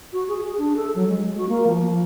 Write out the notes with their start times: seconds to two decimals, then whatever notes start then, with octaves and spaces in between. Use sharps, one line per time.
0.13 F#4
0.28 G#4
0.44 G#4
0.58 D4
0.76 A4
0.95 F#3
1.08 G#3
1.25 G#3
1.37 F#4
1.49 A#3
1.67 F3
1.85 F3